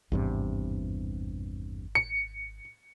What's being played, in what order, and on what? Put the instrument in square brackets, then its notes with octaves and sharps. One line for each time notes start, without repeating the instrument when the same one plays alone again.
[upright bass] G#1 [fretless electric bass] E2 G2 C3
[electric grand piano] C#7